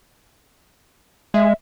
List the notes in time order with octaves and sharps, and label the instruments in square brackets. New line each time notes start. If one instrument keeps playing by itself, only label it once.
[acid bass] G#3 [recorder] E5